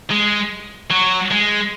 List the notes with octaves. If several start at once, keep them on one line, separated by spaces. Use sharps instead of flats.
G#3
F#3
G#3